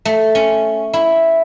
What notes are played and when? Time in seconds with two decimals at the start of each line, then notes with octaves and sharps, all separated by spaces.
0.05 A3
0.35 C#4
0.93 E4